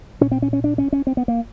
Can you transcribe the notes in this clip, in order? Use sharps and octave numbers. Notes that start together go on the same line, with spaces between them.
A#2 C#4
C4
C#4
C#4
D4
C#4
C#4
C4
B3
A#3